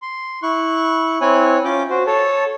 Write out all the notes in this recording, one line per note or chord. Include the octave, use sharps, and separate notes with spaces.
C6
E4 C#6 F#6
C4 E4 C#5 G#5 F#6
C#4 F4 D6 G6
F#4 C5
A4 C#5 A5